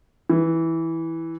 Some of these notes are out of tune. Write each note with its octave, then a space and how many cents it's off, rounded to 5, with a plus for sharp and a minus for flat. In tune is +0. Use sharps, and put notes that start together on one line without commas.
E3 -10